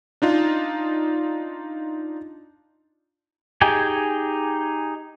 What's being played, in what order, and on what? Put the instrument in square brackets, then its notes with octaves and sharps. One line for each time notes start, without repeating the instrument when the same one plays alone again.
[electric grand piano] D4 D#4 F4
[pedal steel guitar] D#4 G4 G#4 G5 G#5